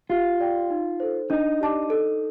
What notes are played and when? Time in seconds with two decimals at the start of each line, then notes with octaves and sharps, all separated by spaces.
0.09 F4 G4
0.40 D5 G5
0.70 D#4
1.00 A4 C5
1.30 D4 D#4
1.61 G4 D5 A5 D6
1.90 A4